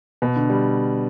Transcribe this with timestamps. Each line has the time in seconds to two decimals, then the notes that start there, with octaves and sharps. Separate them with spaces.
0.22 B2
0.36 D3
0.50 G3